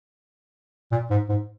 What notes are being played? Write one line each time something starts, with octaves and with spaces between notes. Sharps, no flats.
A#2
G#2
G#2